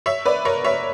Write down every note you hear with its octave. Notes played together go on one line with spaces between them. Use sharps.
C#5 E5
B4 D5
A#4 C#5
C#5 E5